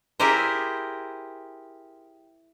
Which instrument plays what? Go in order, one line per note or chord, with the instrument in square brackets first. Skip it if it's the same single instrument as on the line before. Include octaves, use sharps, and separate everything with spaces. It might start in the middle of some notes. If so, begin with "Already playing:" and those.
[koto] E4 G4 G#4 A#4 C5